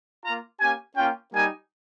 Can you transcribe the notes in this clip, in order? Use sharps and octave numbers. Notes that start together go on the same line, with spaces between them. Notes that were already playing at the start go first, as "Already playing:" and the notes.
A#3 F4 A#5
A#3 C#4 G4 G#5
A#3 C#4 F4 G5
G3 A#3 D#4 G4 G#5